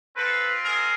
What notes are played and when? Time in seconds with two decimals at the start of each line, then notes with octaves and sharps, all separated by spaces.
0.16 C4 F4 A4 B4
0.63 G#4 A#4